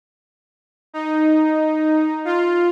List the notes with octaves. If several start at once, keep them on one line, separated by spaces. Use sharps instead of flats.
D#4
F4